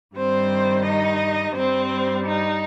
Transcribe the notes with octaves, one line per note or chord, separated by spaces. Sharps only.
G2 D#3 G3 C4 C5
D#4 D#5
G2 G3 C4 C5
D#4